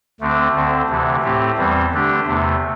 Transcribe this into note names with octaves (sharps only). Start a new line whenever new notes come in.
D2 D3 A3 C4
D2 D3 C4
D2 C3 E3
A2 A3 C4 G4
E2 E3 G3 C4
D3 A3 D4 G4
E2 C3 A3